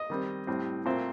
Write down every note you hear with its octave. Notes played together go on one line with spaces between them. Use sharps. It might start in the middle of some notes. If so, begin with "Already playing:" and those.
Already playing: D#5
D#3 G3 C4
A2 G3 C4
A#2 A3 C4 C5